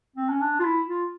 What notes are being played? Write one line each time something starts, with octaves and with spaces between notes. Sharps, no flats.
C4
C#4
D4
F4
E4
F4